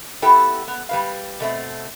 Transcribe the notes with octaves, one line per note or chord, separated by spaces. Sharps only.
B3 E4 G4 A4 G5
B3
G3 B4 F5
B2 A3 C4